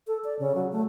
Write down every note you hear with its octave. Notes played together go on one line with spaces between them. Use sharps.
A4
D5
C#3
F#3
A3